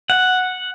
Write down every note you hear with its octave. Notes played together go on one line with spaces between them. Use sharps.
F#5